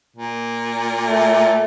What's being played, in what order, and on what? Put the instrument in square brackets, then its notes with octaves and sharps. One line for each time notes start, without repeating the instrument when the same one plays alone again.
[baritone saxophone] A#2
[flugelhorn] A3